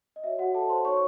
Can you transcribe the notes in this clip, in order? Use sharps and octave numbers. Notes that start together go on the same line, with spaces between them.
D#5
F#4 C#5 E5
F#4 F#5
A4 A5
C5 C6
D#4 F#4 C5 C#5 C#6